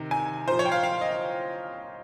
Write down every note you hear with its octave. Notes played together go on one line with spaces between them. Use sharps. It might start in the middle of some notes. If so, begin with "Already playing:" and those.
Already playing: C3 D#3
G#5
A#2 F3 C5
C#5
G5
F5
F5
D#5